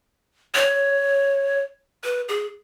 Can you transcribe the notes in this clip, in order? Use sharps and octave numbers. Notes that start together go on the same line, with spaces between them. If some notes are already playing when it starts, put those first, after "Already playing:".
C#5
B4
G#4